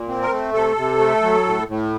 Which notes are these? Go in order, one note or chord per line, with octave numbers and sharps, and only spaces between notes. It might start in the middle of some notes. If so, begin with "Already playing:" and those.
Already playing: A#2
C4
A#4
A3
C3 A4
C3
A3
F#3
A2
A2